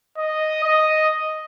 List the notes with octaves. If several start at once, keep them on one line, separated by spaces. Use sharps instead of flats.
D#5
D#5